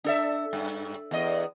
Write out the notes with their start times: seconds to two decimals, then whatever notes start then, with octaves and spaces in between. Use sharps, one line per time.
0.04 D4 A4 E5
0.53 G2
1.11 E2 D#5